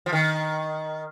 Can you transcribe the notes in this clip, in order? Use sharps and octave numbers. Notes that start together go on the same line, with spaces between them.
F3
D#3